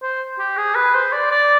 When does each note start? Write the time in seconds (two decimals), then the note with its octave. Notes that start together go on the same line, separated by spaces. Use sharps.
0.02 C5
0.39 G4
0.57 G#4
0.75 B4
0.94 C5
1.13 D5
1.31 D5